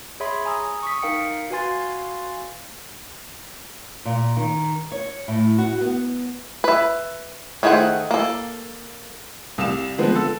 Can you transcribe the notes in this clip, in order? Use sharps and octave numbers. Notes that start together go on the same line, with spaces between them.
G#4 C#5 E5 B5 C6
G#5 A#5 D#6 E6
C#6 D#6 B6
D#4 A#4 F5 G5 C#7
F#4 B4 F5 G#5 C6 A6
A#2
D#3
C#5
A2
F#4
B3
B4 E5
D#3 A3 G#4 C5 F#5
A#3 A4
C2 F5 E7
D3 F3 G#3 B3 C4
A4